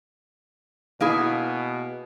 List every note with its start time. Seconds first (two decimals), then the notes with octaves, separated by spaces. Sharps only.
1.01 B2 A#3 E4 G#4